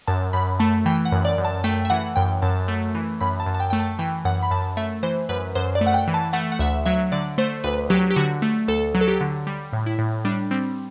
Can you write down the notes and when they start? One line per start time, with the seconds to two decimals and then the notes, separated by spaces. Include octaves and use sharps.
0.08 F#2 A5
0.33 F#2 B5
0.59 A3 A5
0.86 E3 G5
1.05 F#5
1.12 F#2
1.25 D5
1.38 F#2
1.45 A5
1.64 A3 G5
1.85 E5
1.90 E3 F#5
2.16 F#2 G5
2.42 F#2 A5
2.68 A3
2.95 E3
3.21 F#2 B5
3.40 A5
3.46 F#2
3.55 A5
3.60 G5
3.70 A3 G5
3.80 A5
3.99 E3 G5
4.25 F#2 F#5
4.43 B5
4.51 F#2 A5
4.77 A3 E5
5.03 E3 C5
5.29 F#2 B4
5.55 F#2 C5
5.75 D5
5.81 A3
5.86 F#5
5.94 G5
6.08 E3
6.14 A5
6.33 A3 F#5
6.52 F#5
6.59 D2 E5
6.85 F#3 E5
7.12 D3 D5
7.38 A3 C5
7.64 D2 B4
7.90 F#3 G4
8.11 G4
8.16 D3 F#4
8.42 A3
8.68 D2 A4
8.95 F#3
9.01 A4
9.08 G4
9.21 D3
9.47 G3
9.73 A2
9.86 E4
9.99 A2
10.25 G3 D4
10.51 G3 C4